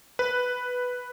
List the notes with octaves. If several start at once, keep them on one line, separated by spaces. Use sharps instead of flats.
B4